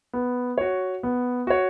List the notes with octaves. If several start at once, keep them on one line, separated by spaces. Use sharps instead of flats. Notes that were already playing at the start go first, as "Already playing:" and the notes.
B3
F#4 C#5
B3
F#4 C#5